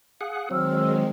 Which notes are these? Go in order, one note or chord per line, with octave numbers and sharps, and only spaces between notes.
G#4 F5 F#5
D#3 F#3 G#3 C4 E6 F6